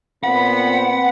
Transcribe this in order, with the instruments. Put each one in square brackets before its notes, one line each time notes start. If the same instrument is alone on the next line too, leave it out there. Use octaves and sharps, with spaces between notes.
[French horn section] A#2 B3 C4 [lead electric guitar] F#5 [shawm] B5